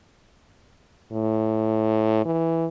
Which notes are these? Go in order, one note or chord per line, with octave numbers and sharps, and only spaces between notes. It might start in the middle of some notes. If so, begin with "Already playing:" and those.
A2
E3